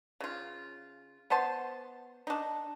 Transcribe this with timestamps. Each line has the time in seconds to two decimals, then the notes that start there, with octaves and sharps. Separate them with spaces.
0.20 C#3 F4
1.30 B3 C5 A5 C6
2.27 D4 D#4